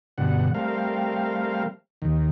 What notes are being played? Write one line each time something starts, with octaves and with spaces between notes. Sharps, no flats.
G2 B2 D3 F#5
G3 A3 C4 A#4 F5
D#2 D#3